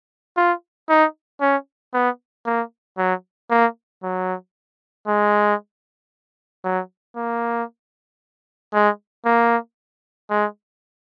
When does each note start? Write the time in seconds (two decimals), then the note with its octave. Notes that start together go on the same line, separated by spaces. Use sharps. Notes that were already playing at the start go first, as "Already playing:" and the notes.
0.37 F4
0.89 D#4
1.41 C#4
1.94 B3
2.46 A#3
2.98 F#3
3.50 A#3
4.03 F#3
5.07 G#3
6.64 F#3
7.16 A#3
8.73 G#3
9.25 A#3
10.30 G#3